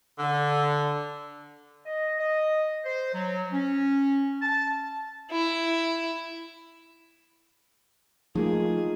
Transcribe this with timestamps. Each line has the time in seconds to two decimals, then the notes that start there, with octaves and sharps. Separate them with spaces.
0.19 D3
1.86 D#5
2.20 D#5
2.85 C5
3.14 F#3
3.52 C#4
4.42 A5
5.31 E4
8.35 F3 A3 A#3 D#4 F4 G#4